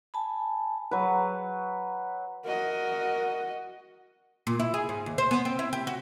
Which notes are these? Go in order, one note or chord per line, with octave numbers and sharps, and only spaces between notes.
G#5 A5 B5
F#3 B4
F#4 A#4 D#5
A#2
E4
G#4
G#2
D#2
C5
B3
C4
E4
G4
F#4